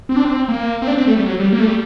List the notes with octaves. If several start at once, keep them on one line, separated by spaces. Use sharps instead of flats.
C4
D4
C4
A#3
C4
D4
C4
A3
G3
F#3
G3
A#3
A3
G3